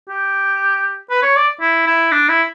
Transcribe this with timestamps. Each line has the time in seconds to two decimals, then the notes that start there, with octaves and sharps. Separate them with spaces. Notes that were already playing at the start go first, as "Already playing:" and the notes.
0.08 G4
1.10 B4
1.22 C#5
1.36 D5
1.61 E4
1.87 E4
2.12 D4
2.29 E4